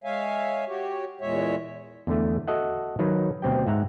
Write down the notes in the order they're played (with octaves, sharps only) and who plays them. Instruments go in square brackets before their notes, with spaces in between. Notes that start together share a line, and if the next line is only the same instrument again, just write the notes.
[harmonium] G#3 C#5 E5 F5 G#5
F#4 G4 C#5
E2 A#2 G#3 C#5 E5
[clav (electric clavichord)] E2 D3 A3
F#4 A4 D#5 E5 F#5
D#3 F#3 D#4 B4
D2 B2 C4 G4 G5
G#2 E5 F#5 A#5